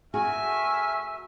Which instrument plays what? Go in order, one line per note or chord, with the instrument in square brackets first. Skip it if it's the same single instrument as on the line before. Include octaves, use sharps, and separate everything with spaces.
[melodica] A3 A#4 [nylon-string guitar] F#4 G#4 [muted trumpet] E5 [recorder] G#5